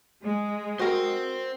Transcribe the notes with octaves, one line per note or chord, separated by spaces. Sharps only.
G#3
F#4 A#4 C5 G5